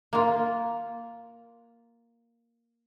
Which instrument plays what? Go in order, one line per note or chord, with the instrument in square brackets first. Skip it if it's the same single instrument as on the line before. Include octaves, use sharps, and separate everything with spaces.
[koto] A#3 F4